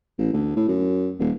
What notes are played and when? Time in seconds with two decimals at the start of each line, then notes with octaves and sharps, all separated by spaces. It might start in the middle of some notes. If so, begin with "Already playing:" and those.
0.18 A1
0.33 D2
0.56 A2
0.68 F#2
1.19 D#1